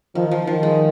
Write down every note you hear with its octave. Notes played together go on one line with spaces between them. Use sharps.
D#3 F3
F3
D#3 F3
G#3